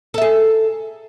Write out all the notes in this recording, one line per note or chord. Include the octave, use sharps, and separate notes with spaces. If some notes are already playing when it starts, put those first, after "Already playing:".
G#4 A4 E5